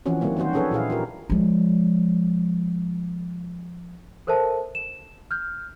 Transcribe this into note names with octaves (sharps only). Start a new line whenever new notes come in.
E3 F3 C4 C#4 F#4
D#3 F#3 G3 A#3 C4
D#3 E3 C4 F#4 C5
C#4 D4 G#4 A4 B4 C#5
A#2 E4 G#4 F5
F4 G4 A#4
F3 G#3
A4 A#4 C5 E5 A5
E7
F6 G6